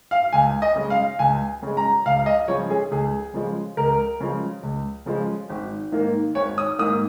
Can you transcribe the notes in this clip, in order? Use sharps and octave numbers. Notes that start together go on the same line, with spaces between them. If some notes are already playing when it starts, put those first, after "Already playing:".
F5
C#2 G#5
D#5
C#3 G#3
F5
C#2 G#5
C#3 G#3
A#5
C#2 F5
D#5
C#3 F3 G#3 C#5
G#4
C#2 G#4
C#3 F3 G#3
C#2 A#4
C#3 F3 G#3
C#2
C#3 F3 G#3
G#1
G#2 D#3 A#3
G#1 C#5
D#6
G#2 D#3 A#3 D#6